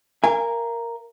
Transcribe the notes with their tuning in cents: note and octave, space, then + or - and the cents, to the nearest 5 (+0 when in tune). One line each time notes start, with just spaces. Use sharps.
A#4 +0 F5 -40 G#5 -20